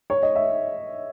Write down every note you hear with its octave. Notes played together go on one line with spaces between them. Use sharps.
C#5
D#5
E5